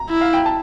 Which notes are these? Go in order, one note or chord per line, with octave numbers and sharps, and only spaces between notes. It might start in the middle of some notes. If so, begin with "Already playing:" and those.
Already playing: A#5
E4
F5
G5
A5